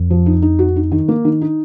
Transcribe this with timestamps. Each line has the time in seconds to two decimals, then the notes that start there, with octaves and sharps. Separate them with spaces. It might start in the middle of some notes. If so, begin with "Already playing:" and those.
Already playing: F2
0.10 F3
0.26 D#4
0.42 D#4
0.59 F#4
0.76 D#4
0.92 D#3
1.08 A#3
1.25 D#3
1.41 D#4